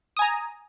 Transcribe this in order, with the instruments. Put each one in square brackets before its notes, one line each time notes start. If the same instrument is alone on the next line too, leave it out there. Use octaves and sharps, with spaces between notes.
[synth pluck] D#6
G#5
A#5